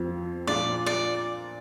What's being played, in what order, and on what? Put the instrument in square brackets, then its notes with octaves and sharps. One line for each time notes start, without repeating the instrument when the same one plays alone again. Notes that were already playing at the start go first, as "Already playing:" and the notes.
Already playing: [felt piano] F2 F3 C4
[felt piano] A#2 F3 D4 F4 [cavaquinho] D5
[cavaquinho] D5